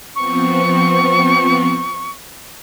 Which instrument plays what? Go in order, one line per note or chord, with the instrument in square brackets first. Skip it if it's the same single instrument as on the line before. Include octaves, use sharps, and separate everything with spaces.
[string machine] F3 B3 C4 [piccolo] C#6